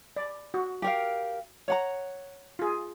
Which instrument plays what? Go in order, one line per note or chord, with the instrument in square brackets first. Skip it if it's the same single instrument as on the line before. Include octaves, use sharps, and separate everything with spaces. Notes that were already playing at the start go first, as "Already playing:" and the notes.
[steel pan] D5
F#4
[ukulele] G4 A#4 F5
C#5 F#5 A#5
[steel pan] F4 G#4